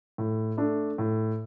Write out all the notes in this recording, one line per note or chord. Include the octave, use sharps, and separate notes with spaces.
A2
A3 D4
A2